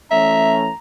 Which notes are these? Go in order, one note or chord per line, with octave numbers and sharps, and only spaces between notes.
E3 A3 C#4 E5 A#5